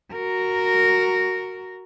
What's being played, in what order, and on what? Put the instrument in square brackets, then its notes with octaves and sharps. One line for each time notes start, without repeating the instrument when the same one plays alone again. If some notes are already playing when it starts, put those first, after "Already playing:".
[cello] F#4 A#4